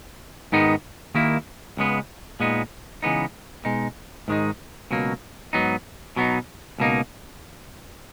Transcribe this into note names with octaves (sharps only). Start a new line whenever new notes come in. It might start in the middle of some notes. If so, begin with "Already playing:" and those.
G#2 D#3 G#3 B3 D#4
D#2 D#3 A#3 E4
C#2 C#3 G#3 B3
A#2 G#3 B3 D#4
C#3 E3 G#3 B3 D#4
B2 G#3 D#4
G#2 D#3 G#3 D#4
C#2 B2 F#3 A#3
G#2 F#3 B3 D#4
B2 F#3 B3 D#4
C#2 B2 A#3 D#4